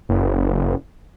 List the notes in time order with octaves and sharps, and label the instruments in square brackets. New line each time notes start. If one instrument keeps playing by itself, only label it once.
[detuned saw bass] F#1